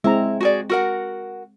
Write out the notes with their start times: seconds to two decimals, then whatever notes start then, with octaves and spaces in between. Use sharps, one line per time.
0.04 G#3 C4 E4 A#5
0.40 F#4 G#4 D5
0.69 F#4 A#4 F#5